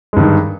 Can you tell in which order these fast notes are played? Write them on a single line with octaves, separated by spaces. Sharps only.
G#3 G2 D#3